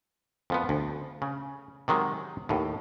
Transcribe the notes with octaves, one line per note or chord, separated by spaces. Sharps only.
F2 F3 B3
D2
C#3
C3 D#3 F#3 G#3
D#2 A2